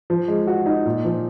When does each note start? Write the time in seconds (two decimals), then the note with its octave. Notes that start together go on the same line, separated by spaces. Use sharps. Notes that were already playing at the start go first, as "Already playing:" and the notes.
0.10 F3
0.28 G#3
0.47 F#4
0.66 D#4
0.85 A#2
1.04 F3